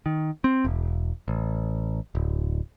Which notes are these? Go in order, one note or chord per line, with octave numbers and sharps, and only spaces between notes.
D#3
C4
E1
A1
D1